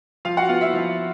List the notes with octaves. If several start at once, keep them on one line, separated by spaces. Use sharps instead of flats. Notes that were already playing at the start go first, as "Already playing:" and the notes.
F3 F4 F5
F#4 F#5
B3 F4 F5
E4 E5
F3